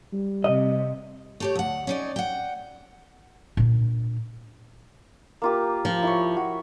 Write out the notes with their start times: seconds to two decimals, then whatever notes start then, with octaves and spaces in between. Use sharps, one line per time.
0.13 G3
0.44 C3 D#5
1.40 A3 G4 C#5
1.55 D2 F#5
1.87 C#4 D#4 D5
2.16 F#5 G5
3.57 A#2 D4
5.42 A#3 F4 G4
5.85 F3
6.03 E4 B4 C#5
6.36 F#4